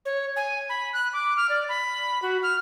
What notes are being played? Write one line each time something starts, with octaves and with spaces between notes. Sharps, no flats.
C#5
G#5
B5
F#6
D6
F6
D5
B5
F#4
F6